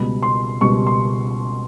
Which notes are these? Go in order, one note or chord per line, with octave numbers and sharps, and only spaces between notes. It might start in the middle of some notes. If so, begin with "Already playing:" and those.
Already playing: C#2 B2 G3 B5
C6
C#2 B2 G3 C#6
C6